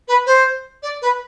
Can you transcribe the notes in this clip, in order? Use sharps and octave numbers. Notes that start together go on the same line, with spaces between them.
B4
C5
D5
B4